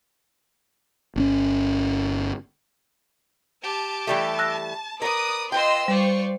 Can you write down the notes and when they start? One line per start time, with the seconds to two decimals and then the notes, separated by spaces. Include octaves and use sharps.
1.16 G1 C4 C#4
3.64 G4 A5
4.07 E3 G3 A3
4.39 E6 F#6 A#6
5.02 A#4 B4 D5 D#6
5.52 F4 B4 D#5 G5 C6 E6
5.88 G3 F4 C5 D5 C#6